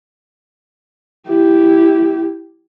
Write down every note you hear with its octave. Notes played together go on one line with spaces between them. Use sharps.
E4 G4